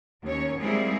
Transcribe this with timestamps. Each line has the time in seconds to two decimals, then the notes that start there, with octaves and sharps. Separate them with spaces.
0.24 D#2 C#4 C#5
0.61 G3 G#3 A#3 C4 E4 G#4